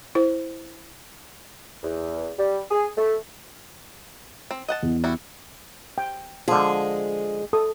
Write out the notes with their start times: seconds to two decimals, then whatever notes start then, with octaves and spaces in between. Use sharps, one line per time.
0.15 E4 C5
1.83 E2
2.39 G3
2.71 G#4
2.97 A3
4.51 C4
4.68 D#5 F#5 A5
4.83 E2
5.04 G3 E4 F#4
5.98 G5
6.48 D3 F3 G#3 G#4
7.53 A4 D#6